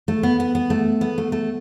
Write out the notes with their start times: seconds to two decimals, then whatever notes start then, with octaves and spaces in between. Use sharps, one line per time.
0.08 A3
0.23 B3
0.40 B3
0.55 B3
0.70 A3
1.01 B3
1.18 A3
1.32 A3